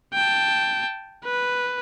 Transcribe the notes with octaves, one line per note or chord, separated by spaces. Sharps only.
G5 A5
B4